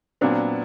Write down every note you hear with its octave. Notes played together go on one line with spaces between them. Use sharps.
A#2 F#3 B3 C4 D4